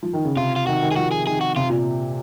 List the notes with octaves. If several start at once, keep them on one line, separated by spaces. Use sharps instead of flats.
F3
D#3
C#3
C3 F4
F4
D#3 F#4
D#3
G#4
F3 F#4
G#4
D#3 G#4
F#4
C3 F4
A#2